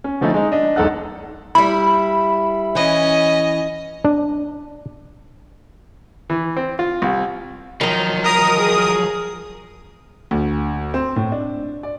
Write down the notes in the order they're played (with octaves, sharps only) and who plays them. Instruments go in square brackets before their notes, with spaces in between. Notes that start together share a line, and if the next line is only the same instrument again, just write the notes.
[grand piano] C#4
D3 F3 A3 C#4 D#4 E4
G#3 D#4
D4 D#5
E1 B1 D#4 A4 F#5 F#6
[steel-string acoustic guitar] G3 E4 [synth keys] B5
[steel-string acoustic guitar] E3 [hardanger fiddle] C#4 D#5
[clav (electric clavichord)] D4
[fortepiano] E3
C4
F4
C2
[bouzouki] D#3 D#4 [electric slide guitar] F3 F#3
[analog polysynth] A#4 D#6 [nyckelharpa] A#5
[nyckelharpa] G#4
[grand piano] D2
C4
A2
D4
D5